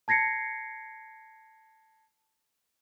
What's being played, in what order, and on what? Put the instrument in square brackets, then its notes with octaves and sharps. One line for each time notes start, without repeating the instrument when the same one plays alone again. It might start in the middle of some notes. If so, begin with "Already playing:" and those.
[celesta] A5 G#6 A#6 C7 C#7